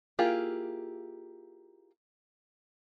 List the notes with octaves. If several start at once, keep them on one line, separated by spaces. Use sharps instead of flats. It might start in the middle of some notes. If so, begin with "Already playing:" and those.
A#3 E4 F4 G4 G#4